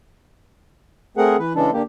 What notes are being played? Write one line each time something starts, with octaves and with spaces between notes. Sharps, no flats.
A3 C4 G#4 A#4 F#5
E3 B4
C#3 E3 G#3 D4 A4
D3 A#3 G4